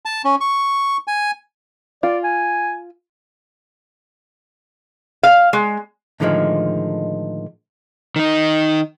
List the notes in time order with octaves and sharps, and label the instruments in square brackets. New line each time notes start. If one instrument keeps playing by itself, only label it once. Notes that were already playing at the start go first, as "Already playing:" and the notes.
[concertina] A5
C#4
C#6
G#5
[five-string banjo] F4 [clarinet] D5
[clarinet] G#5
[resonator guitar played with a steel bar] F5
G#3
[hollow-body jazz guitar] A2 D3 D#3 F3 G3 G#3
[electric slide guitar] D#3 D#4